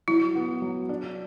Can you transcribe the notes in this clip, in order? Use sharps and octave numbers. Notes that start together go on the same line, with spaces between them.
F#3 E4
B3
F#3
D4